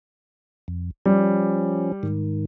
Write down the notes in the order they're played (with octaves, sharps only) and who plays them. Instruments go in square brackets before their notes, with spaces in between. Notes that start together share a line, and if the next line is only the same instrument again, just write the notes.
[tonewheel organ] F2
[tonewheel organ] F3 C#4 [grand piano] G3
[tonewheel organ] G#2 D#3